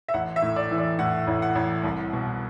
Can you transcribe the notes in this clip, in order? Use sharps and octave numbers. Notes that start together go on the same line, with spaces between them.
E5
A1 F#5
E5
A2
D5
E3
D5
A2 F#5
A1
F#5
A1
C2
B2